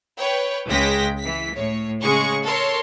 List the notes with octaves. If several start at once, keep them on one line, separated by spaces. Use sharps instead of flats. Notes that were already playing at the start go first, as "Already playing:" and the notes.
B4 C#5 G5
C#2 C#3 G#3 G5 A#6 B6
E3 B6
A2 C#5
C#3 G#3 G#4 C#6
A4 A#4 C#5 C6